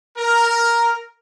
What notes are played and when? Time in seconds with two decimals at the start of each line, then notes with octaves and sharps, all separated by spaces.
0.17 A#4